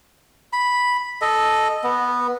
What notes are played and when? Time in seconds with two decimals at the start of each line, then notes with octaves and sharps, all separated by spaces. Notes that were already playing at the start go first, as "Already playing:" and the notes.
0.53 B5
1.22 A4 D#5
1.84 B3